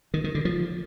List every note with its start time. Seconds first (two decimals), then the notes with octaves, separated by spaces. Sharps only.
0.14 D#3
0.24 D#3
0.35 D3
0.45 F3